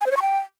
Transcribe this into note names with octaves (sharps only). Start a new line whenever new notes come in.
G#5
C5
C#5
C#6
G5